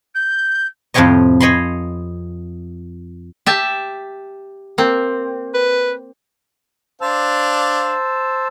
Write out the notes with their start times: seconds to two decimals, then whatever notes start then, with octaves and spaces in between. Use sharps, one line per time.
0.14 G6
0.94 F2 A2 C3 G4 C#5 D#5
1.40 C#5 D#5 G#5 B5 C6
3.46 G4 E5 A5
4.78 A#3 C4
5.54 B4
7.01 D4 C5 D5 F5 A5 E6